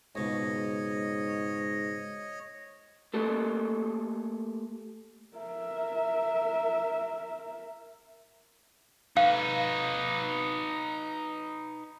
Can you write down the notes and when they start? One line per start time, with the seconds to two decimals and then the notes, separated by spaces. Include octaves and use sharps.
0.15 C#2 G#2 B2 C#5 D#5
3.14 A3 A#3 G4 A4
5.37 A#4 E5
9.17 D#4 B4 F5